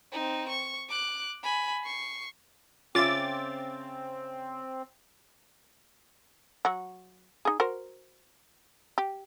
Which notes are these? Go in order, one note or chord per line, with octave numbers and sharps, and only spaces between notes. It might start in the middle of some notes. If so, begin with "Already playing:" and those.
C4 D#4
C#6
D6 F#6
G#5 B5
C#6 C7
C#3 C4 F4 E5 D6 A6
F#3 F#4
D#4 G#4
F#4 A#4 C5
G4